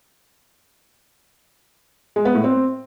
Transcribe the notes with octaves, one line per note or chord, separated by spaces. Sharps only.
G#3
B3
A2
C4